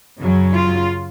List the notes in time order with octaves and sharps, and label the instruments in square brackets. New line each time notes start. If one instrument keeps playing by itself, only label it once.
[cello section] F#2 C#3 F#3
F4